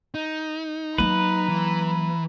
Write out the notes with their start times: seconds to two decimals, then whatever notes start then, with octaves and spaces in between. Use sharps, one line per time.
0.15 D#4
0.98 F#3 A#3 B4 A#5 B5
1.49 E3